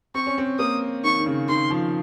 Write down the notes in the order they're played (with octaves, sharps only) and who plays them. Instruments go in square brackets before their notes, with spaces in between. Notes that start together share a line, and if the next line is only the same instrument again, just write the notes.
[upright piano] C4 [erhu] C#6
[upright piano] C#4
C4
[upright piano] A#3 [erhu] D#6
[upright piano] D#3 [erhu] C#6
[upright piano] D#3
C#3
[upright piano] D#3 [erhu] C6
[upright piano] F3